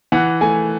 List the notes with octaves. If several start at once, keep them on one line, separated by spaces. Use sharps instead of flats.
E3 F#5
A3 G#5